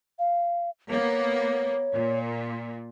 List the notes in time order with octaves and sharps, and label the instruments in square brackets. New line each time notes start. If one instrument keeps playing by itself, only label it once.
[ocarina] F5
[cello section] A#3 B3 [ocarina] C#5
[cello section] A#2